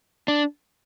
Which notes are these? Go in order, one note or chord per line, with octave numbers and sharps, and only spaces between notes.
D4